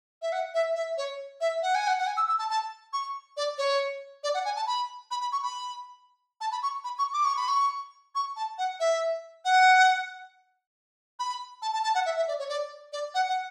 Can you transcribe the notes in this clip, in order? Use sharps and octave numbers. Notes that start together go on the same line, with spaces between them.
E5
F#5
E5
E5
C#5
E5
F#5
G#5
F#5
F#5
G#5
E6
E6
A5
A5
C#6
D5
C#5
D5
F#5
G#5
A5
B5
B5
B5
C#6
B5
A5
B5
C#6
B5
C#6
D6
C#6
B5
C#6
C#6
A5
F#5
E5
F#5
B5
A5
A5
A5
F#5
E5
E5
D5
C#5
D5
D5
F#5
F#5